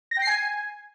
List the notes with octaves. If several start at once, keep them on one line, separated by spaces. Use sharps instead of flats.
A#6
G5
C7
G#5